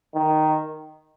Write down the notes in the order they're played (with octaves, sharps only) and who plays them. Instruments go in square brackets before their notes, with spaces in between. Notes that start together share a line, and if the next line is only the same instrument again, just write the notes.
[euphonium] D#3